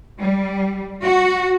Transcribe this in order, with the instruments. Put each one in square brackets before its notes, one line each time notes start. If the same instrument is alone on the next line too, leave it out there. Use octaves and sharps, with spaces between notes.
[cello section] G3
F#4